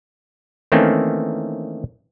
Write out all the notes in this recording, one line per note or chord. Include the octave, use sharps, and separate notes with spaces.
D#3 E3 A3 A#3 C4 C#4